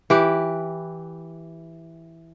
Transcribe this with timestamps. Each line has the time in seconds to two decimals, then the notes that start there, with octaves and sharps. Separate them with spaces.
0.10 E3 G4 B4